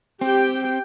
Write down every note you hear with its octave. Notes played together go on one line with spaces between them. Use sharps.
C4 G4 G5